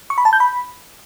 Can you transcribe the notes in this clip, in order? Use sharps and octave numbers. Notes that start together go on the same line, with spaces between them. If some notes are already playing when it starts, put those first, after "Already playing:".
C#6
B5
A5
G6
B5